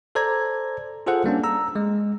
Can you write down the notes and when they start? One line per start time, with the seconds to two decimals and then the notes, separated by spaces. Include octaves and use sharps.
0.15 A4 C5 D5 A#5 G#6
1.07 F4 G#4 A4 C5 F#5
1.24 G3 A#3 C#4 D4
1.44 A#5 E6
1.75 G#3